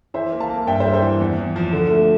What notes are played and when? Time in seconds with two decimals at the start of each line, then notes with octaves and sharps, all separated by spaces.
0.14 E3 C5 E5
0.32 A#3
0.40 F5 A5
0.50 A#3
0.67 G2 E5 G5
0.80 C5 E5
0.85 G3
0.93 C5 E5
1.02 E3
1.20 E2
1.38 E2
1.56 F3
1.73 D3
1.90 A3